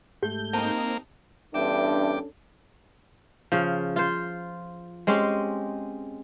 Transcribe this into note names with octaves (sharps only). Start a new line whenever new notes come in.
G#2 A3 G4 G6
A#3 C4 D#4 A5
E2 G2 C#4 D4 A4 E5 G5 D6
C#3 F3
F4 C5
G#3 C4 C#4 G4